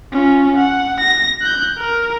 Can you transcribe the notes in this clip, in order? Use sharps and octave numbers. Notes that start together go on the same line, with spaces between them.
C#4 F4
F#5
A#6
F#6 G6
A#4